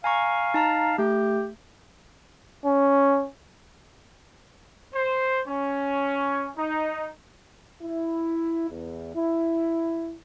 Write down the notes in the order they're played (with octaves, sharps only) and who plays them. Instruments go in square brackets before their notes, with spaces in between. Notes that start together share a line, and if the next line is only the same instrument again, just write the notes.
[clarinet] F5 [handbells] G#5 A#5 C#6
[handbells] D#4 A5 A#5
[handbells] A3 [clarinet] G4
[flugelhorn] C#4
[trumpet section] C5
C#4
D#4
[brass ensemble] E4
E2
E4